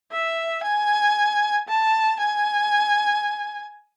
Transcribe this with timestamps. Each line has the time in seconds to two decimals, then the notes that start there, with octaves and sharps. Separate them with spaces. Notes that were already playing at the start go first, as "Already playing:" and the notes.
0.12 E5
0.64 G#5
1.68 A5
2.20 G#5